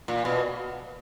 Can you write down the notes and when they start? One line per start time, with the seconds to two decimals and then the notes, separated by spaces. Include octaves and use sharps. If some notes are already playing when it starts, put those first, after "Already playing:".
0.08 A#2
0.25 B2